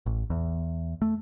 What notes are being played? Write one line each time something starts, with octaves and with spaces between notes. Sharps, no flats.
A1
E2
A3